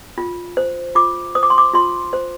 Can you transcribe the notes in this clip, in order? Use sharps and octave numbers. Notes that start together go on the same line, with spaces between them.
F4
C5
F4 D6
C5 D#6
D6
C6
D6
F4 C6
C5